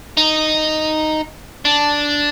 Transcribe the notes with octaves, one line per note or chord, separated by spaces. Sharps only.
D#4
D4